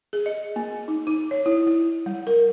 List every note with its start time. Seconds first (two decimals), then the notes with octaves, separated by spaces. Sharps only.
0.13 G#4
0.26 D#5
0.56 A#3
0.88 D#4
1.07 D#4
1.31 C#5
1.46 E4
1.67 E4
2.06 G3
2.27 A#4